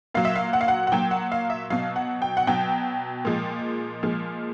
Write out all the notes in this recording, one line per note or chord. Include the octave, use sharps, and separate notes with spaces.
A#2 F#3 F5
E5
F5
F#5
F5
F#5
F#5
A#2 F#3 G5
F#5
F5
E5
B2 F#3 F5
F#5
G5
F#5
B2 F#3 G5
A#2 F3 G#3
A#2 F3 G#3